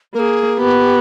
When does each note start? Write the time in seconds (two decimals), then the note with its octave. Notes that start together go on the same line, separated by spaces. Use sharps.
0.14 A#3 A#4
0.19 G#4
0.59 B3 G4